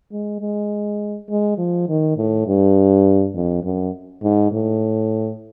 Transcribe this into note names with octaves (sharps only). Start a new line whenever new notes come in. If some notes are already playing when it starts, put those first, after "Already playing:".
G#3
G#3
G#3
F3
D#3
A2
G2
F2
F#2
G#2
A2